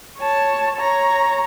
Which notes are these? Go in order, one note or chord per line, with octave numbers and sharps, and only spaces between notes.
C#5 A5
C#5 A#5